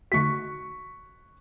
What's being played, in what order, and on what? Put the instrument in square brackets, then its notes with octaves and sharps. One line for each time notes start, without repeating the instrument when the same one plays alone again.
[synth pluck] D3 A3 F#4 [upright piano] C#6 B6